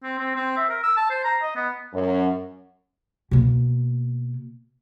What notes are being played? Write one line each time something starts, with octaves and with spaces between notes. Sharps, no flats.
C4
C4
C4
E5
A#4
E6
A5
C5
A#5
D#5
B3
F#2
B2 A#3